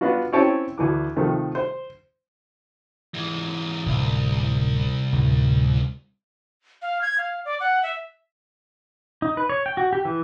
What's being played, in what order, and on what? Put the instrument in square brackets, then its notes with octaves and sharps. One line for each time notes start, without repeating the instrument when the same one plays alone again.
[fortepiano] B3 D4 F4 F#4
C4 C#4 E4 C#5 G5 A5
D2 E3 D6
C3 D#3 F3 A3
C5
[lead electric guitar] G#2 E3
[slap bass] D1 [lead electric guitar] C2
[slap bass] D2 A2 C3
[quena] F5
G#6
F5
D5
F#5
E5
[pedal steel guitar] D#4
B4
C#5
G5
F#4
G4
E3